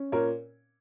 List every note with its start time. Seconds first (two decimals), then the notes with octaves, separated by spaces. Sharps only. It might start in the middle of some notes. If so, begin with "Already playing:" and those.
Already playing: C#4
0.12 A#2 A#4 C#5